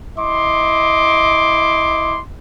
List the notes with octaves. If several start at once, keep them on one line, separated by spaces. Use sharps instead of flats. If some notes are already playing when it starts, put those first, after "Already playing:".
E4 D#5 C6 D6